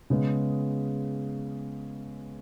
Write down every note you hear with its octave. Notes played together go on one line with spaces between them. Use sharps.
C#3 G#3 B3